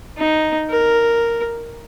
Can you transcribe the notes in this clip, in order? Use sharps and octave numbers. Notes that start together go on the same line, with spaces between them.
D#4
A#4